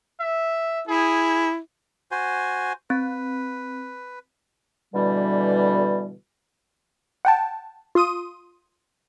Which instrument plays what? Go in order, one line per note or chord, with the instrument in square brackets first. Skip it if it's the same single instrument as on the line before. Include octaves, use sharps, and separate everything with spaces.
[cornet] E5
[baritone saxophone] E4 [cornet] G#4
[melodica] F#4 C5 G#5
[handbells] C4 [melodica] B4
[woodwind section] B2 D3 E3 G3
[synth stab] F#5 G5 A5
F4 C6 D#6 D#7